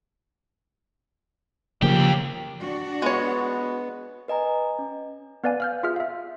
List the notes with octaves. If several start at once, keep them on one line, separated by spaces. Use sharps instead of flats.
D#2 C#3 F3 A#3 G4
D4 F#4
G#3 B3 C#5
B4 D#5 G#5 A#5
C#4
B3 B4 D5 F5 G#5
F5 F6 G6
F4 G#4 E5 F6
E5 F5